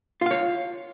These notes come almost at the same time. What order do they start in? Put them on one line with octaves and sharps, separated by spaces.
F4 F5 C#5